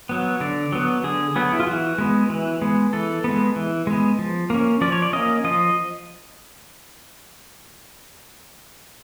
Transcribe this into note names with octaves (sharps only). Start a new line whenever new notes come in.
F#3 B3
D3 D5
F#3 B3
D3 G#4
F#3 B3 G#4
E4
F4
E3 F#4
G#3 B3
E3
G#3 B3
E3 A4
G#3 B3
E3
G#3 B3
F3
A#3 C#4
F3 D5
C#5
D5
A#3 C#4 D#5
F3 D#5